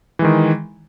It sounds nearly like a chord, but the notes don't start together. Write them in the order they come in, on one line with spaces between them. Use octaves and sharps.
E3 G#3 D#3